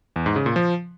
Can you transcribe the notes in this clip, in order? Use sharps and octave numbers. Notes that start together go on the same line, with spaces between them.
E2
G#2
C#3
A#2
F3